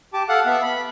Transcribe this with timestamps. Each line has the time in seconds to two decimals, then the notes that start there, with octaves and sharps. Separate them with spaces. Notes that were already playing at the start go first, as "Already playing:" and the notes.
0.13 G4 A5 D6
0.29 A4 F5 F#5
0.46 B3 E5
0.62 B5